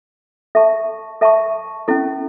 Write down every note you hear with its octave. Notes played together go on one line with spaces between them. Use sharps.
A4 E5 A5 C#6
A4 E5 A5 C#6
C#4 E4 A4